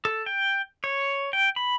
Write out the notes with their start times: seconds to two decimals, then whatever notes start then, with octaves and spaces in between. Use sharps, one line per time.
0.05 A4
0.26 G5
0.84 C#5
1.33 G5
1.56 B5